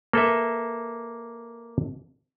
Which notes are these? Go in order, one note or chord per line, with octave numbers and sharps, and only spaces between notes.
A#3 A4 B4 E5